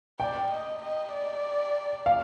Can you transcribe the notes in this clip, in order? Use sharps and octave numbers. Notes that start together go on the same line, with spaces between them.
D5 G5
D#5
D#5
D5
F5